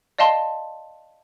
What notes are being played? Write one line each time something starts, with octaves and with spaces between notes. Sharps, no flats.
D5 D#5 F5 A5 C6